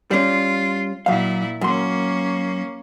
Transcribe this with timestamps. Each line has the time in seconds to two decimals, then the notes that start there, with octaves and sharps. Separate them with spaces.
0.11 G3 C#4 F4
1.06 A#2 F#3 E4 F5
1.61 F#2 A#3 C#4 C6